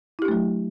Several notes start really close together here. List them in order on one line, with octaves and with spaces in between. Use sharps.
E4 G4 D4 A3 F#3